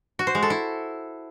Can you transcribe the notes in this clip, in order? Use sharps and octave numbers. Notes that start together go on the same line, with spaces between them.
F#4
C5
G#3
A4
E4